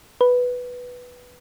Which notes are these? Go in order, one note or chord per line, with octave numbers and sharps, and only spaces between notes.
B4